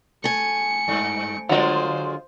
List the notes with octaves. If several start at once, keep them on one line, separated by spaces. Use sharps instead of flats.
A3 G#5 C#7
G2
D3 F#3 G#3 F4 C5